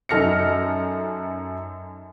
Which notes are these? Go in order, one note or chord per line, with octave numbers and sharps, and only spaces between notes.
F#2 D#4 A4 F6 A#6 C#7